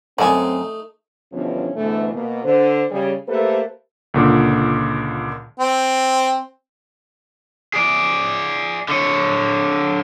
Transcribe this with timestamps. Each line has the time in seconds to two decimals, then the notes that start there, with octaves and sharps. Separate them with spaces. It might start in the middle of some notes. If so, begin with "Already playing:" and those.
0.19 F#2 A3 C4 D#4 D5 D#5 G#5
1.33 E2 G2 B2 D3 F3 C#4
1.76 G#2 B2 D3 E3 A3
2.13 B2 A#3 B3
2.44 D3 C5
2.91 C#3 G3 G#4
3.28 A3 A#3 G4 A4 B4 C5
4.14 C#2 A#2 D3
5.59 C4
7.74 G#4 D5
8.89 D3 C#5